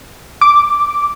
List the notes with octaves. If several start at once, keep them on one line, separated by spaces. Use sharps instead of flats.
D6